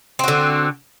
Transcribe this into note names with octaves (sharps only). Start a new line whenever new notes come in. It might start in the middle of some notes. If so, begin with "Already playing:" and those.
D3 C4 F#4